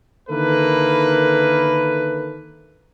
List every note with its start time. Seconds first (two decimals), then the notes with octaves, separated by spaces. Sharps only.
0.29 D3 D#3 A#3 E4 A4 B4